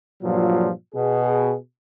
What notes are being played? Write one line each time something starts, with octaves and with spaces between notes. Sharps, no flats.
G2 A#2 F3 F#3
B2 G#4